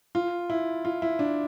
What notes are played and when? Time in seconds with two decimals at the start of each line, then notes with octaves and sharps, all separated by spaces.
0.15 F4
0.50 E4
0.85 F4
1.02 E4
1.19 D4